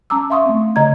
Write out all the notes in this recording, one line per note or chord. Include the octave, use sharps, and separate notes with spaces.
C#4 A5 A#5 D6 E6
E5 F5 C6 C#6 D#6
A3 C4
C#3 D#5 A#5 G#6